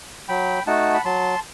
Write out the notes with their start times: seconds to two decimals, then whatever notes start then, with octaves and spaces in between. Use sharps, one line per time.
0.29 F#3 G5 B5
0.67 A3 D#4 F#4 F#5 A5
0.94 B5
1.05 F#3 A5 C6